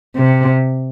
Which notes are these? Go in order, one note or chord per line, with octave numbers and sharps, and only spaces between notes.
C3